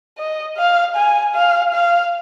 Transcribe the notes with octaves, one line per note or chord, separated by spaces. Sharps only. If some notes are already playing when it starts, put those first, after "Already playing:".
D#5
F5
G#5
F5
F5